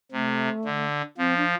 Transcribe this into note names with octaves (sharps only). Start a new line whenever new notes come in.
C3 A3
D3
F3 C4
D4